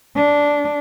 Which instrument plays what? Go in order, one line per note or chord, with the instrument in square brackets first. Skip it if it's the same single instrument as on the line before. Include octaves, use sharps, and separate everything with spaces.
[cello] D4